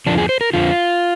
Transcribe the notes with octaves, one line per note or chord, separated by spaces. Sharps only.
F2 D3 F3 D4
G#4
C5
A#4
F2 D3 F3 F4